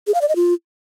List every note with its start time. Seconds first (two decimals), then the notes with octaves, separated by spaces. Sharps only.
0.07 G#4
0.14 F5
0.21 D5
0.29 D#5
0.36 F4